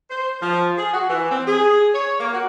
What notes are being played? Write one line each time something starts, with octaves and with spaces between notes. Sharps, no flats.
C5
F3
G#4
F#4
E3
C4
G#4
C#5
A#3
F#4